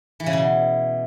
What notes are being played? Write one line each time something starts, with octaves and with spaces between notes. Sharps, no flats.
E3
C#3
B2